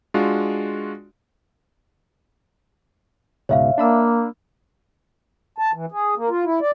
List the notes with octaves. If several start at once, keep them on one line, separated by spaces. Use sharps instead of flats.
G#3 D4 F4 F#4
C#2 G#2 B2 C#5 E5 F5
A#3 D4 B5 E6
A5
E3
G#4
A#3
F4
E4
D5